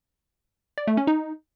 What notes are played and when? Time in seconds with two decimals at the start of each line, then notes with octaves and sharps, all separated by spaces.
0.78 D5
0.87 A3
0.97 C#4
1.07 D#4